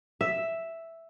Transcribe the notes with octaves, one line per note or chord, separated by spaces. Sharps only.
E5